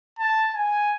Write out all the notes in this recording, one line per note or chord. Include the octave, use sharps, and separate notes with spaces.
A5
G#5